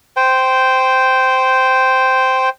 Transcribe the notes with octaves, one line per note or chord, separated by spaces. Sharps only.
C5 G5